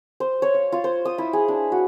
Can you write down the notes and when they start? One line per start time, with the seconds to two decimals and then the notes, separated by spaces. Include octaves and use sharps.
0.20 C5
0.42 C#5
0.54 F5
0.72 F4
0.84 C5
1.05 D#6
1.18 E4
1.33 G#4
1.48 D4
1.72 F#4